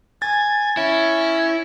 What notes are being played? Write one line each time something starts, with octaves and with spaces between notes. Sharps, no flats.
G#5 A6
C#4 E4